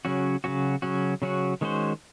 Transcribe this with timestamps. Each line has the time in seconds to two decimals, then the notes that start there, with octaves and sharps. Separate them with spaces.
0.05 C#3 F#3 C#4 F#4
0.44 C#3 F#3 C#4 F#4
0.82 C#3 F#3 C#4 F#4
1.22 C#3 F#3 C#4 F#4
1.61 D#3 G#3 C#4 F#4 C5